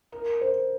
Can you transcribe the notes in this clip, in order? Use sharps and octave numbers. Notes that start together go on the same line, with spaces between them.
A#4
C5